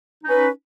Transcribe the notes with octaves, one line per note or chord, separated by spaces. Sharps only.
C#4 D#4 B4